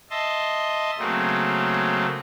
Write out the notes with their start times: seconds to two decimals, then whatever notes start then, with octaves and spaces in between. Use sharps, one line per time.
0.10 D#5 E5 A5 C6
0.98 C#3 F#3 A3 A#3 C4